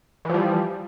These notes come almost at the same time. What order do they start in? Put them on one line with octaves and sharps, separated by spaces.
E3 F3 G3